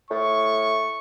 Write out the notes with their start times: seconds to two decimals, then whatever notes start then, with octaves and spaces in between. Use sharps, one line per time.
0.10 A2 C#6